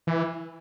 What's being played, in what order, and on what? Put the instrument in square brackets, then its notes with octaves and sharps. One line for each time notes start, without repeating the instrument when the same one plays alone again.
[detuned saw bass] E3